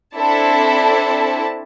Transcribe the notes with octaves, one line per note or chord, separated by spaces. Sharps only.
C4 D4 E4 A4 A5